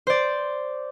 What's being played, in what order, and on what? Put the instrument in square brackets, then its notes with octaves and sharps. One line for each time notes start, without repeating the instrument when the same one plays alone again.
[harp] C5 D5